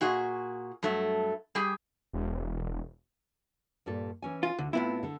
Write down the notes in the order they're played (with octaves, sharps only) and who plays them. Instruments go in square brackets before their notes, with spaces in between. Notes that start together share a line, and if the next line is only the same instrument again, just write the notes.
[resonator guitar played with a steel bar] A#2 F#4 G#4 D#5
G2 F#3 A3
G3 G4 G#4
[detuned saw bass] E1
[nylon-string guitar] G2 A#2 A4
E3 C#4 G#5
[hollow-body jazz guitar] F4
[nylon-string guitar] D2 [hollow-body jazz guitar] D3
[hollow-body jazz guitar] A2 B3 E4 [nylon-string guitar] C4 F4 F5
[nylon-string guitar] D3 A4